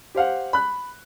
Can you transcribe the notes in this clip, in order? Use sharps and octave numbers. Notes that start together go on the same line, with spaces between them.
G4 C5 F5 F#5
B5 F#6